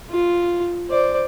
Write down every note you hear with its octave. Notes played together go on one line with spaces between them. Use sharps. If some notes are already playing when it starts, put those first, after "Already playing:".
F4
C5 D5